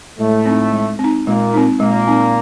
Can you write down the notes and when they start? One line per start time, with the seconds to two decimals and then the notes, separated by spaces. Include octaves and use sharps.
0.18 A2 G#3 A3
0.46 C4 D#4
0.72 G#3
0.99 C4
1.04 D#4
1.26 A#2 G#3 A#3
1.54 C4 D#4
1.80 A#2 G#3 A#3
2.08 C4 D#4